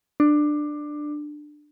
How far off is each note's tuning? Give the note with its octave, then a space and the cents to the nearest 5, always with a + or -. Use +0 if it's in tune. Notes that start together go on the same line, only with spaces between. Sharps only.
D4 +15